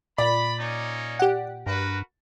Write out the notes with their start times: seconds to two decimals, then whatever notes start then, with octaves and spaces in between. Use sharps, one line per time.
0.18 A#2 D5 B5
0.60 A#3 C#4 D#4
1.19 G4 F#5
1.66 G2 F#4 A#4 B4